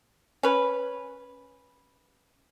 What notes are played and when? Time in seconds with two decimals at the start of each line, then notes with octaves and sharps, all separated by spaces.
0.43 C#4 B4